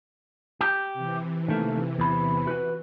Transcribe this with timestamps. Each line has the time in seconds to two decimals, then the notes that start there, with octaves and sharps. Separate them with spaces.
0.61 G4
0.94 C3 E3
1.48 D#3 A3 A#3
1.99 E2 B5
2.47 F#4 B4